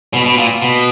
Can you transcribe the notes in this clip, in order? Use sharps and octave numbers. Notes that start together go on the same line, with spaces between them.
B2
B2
A#2
B2